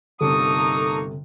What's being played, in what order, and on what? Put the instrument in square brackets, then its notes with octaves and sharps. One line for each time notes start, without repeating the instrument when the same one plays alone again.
[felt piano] G1 C3 [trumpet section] A#3 D#4 C#6 [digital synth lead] A4 [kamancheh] D#6